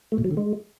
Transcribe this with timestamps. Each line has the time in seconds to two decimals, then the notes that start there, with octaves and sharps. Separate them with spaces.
0.12 A3
0.18 A#2
0.24 F#3
0.31 D3
0.37 G#3